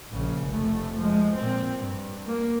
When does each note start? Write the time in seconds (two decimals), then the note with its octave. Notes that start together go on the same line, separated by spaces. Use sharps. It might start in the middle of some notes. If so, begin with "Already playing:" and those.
0.11 A#1 C#3
0.48 F1 A3
0.96 F3 G#3
1.34 A#2 C4
1.77 G2
2.26 A#3